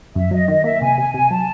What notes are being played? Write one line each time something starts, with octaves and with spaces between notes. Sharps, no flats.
F#2 E5
F#3 D#5
D#3 D#5
A#3 E5
C3 G#5
C3 G#5
C3 G#5
F#3 A5